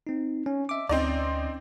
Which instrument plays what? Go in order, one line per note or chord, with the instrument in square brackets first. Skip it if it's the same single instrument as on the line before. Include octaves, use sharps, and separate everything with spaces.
[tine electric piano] C4 D#4
C#4
D#5 E5 D6
[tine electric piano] D2 C#4 [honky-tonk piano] C4 D#4 D5